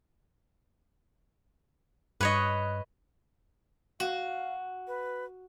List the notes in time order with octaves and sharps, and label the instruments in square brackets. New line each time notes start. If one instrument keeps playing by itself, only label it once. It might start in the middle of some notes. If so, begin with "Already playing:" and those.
[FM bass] G2 [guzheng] B4 C#5 D#5
[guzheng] F#4 [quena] F5
[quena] B4